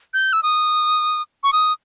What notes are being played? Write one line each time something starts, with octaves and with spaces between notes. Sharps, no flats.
G6
E6
D#6
C#6
D#6